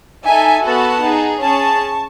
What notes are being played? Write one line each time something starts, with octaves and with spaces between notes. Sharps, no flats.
D#4 A4 E5 G#5
B3 F#4 A4 F#5 A5
D#4 G#4
C#4 G#4 A5 C#6